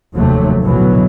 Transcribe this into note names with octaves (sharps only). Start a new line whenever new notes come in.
F1 D#2 C3 F#3 A3
A1 D2 B2 E3 F#3